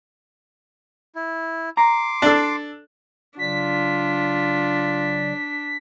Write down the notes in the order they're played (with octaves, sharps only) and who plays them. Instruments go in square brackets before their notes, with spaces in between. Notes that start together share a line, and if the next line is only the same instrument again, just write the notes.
[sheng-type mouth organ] E4
[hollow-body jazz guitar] A#5 [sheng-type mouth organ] C6 D6
[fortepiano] D4 A4
[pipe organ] C#3 F#3 D5 [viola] D4 [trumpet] F4 [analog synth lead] B6